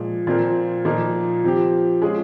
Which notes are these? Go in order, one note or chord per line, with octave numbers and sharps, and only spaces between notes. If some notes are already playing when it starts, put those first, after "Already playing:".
Already playing: A#2 F3 G#3
A#2 F3 C4 F4 A#4
A#2 F3 A#3 D#4 A#4
F3 C4 G4
G#3 C#4 F4 G#4